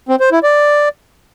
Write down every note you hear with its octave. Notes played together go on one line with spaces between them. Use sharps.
C4
C5
E4
D5